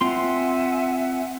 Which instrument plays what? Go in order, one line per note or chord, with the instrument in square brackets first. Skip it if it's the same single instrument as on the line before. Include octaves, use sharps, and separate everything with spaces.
[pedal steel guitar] C4 F4 C6 [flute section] E5 F#5 G#5